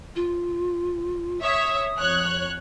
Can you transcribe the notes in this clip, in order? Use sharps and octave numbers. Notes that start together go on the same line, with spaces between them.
F4
C#5 E5 D#6
F2 C#5 F#6